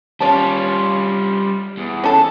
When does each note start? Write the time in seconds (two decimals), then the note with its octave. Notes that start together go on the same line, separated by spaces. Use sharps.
0.20 G3 C#4 F4 D5 A5
1.78 E2
2.04 C#4 A4